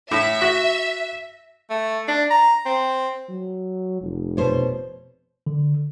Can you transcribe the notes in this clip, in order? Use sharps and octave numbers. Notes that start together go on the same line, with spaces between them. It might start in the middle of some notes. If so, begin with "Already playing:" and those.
A2 E5
F#4
A3
D4
A#5
C4
F#3
F1
B2 C5 C#5
D3